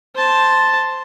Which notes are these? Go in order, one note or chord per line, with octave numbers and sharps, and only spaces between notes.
C5 A5